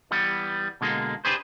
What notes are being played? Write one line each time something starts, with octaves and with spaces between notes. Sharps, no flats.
E3 G3 B3
B2 D3 G#3 A#3
D4 G4 G#4 B4 C5